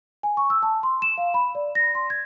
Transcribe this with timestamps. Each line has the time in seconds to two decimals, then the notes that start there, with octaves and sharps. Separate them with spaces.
0.23 G#5
0.37 C#6
0.50 E6
0.63 A5
0.83 C6
1.02 E7
1.18 F5
1.34 B5
1.55 D5
1.75 A#6
1.95 C6
2.10 G#6